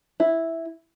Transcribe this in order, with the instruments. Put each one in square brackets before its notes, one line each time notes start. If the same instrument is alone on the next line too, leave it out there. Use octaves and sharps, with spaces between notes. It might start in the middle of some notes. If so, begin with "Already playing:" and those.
[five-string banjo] E4